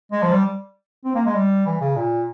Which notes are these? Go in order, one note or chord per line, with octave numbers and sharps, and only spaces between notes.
G#3
F3
G3
C4
A#3
G#3
G3
E3
C#3
A#2